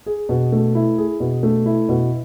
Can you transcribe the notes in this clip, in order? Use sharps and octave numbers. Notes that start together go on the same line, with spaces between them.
G#4
B2
A3
E4
G#4
B2
A3
E4
B2